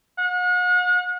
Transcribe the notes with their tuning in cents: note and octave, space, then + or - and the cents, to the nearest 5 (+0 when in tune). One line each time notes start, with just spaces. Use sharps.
F#5 -40